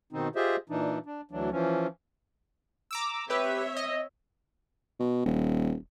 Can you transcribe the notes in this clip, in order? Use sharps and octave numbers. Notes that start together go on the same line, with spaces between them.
B2 D#3 C4 D#4
F4 G4 G#4 C5 D#5 E5
A#2 E3 D4 D#4
D4
D2 E3 F#3 D4
E3 F3 C#4
A#5 D6 E6
C4 G4 B4 C#5 E5
D#5
B2
D#1